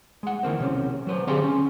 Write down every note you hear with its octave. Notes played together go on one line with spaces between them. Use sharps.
G#3 F#5
D#3 E3 A#3 C4
B1 C3 C#4
F#3 B4 C5
D3 C4 G4 G#4 F5 C6
C#4